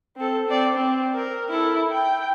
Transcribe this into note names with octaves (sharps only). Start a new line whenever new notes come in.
C4 A4
C4 D5
C4
A#4
E4 A4
G5